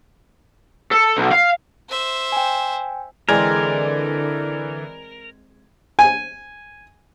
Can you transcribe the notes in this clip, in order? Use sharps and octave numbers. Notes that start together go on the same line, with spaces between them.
A4
B1
F5
C5 E5
G5 G#5
D3 E3 G#3 C4 A#4 D5 G#6
G#5